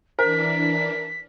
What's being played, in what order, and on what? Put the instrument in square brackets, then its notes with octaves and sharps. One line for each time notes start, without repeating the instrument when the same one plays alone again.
[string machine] E3 D4 [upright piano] A#4 [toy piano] C5 [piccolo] B6